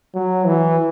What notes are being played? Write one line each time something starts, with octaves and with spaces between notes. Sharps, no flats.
F#3
E3